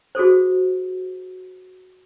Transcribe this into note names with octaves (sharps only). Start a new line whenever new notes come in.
F#4 G#4 A4 C5